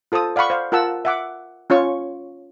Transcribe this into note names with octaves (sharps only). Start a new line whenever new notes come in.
F4 A4 C5 A5 D#6
D5 F5 F#5 B5 C#6
C5 F5
F4 A#4 F#5 A5 E6
E5 F#5 D6
C#4 F4 C#5 C#6